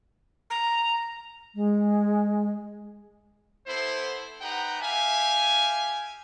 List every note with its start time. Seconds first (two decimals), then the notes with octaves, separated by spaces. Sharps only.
0.50 A#5
1.55 G#3
3.66 B3 E4 A4 C5
4.41 D#4 G4 B4 F#5 G5 A#5
4.80 G4 E5 F5 G#5